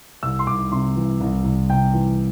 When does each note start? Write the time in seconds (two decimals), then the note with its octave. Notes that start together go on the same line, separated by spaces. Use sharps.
0.23 C2 E6
0.39 C6
0.47 C2 D6
0.72 C3 C6
0.96 E3
1.20 C2
1.45 C2
1.69 C3 G5
1.94 E3